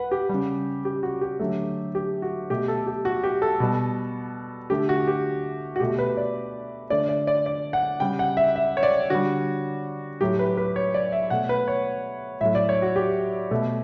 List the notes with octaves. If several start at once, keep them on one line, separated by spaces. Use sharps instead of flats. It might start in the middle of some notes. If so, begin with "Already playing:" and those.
Already playing: B4 F#5
G4
C#3 G3
G4
F#4
G4
D3 F#3 A3
G4
F#4
B2 A3 G4
A4
G4
F#4
G4
A4
B2 G3
D3 A3 G4
F#4
G4
F#4
B2 A3 G4
B4
D5
D3 A3 D5
D5
D5
D5
F#5
C#3 G3 G5
F#5
E5
E5
C#5
D5
D3 G3 F#4
A2 F#3 A3 G4
B4
B4
C#5
D5
E5
B2 A3 F#5
B4
C#5
A2 F#3 A3 E5
D5
C#5
F#4
G4
B2 A3